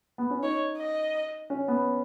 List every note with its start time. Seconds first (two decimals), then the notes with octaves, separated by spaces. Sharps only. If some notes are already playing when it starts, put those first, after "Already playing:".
0.18 B3
0.30 C#4
0.43 D#4 C#5
0.78 D#5
1.50 C#4
1.68 B3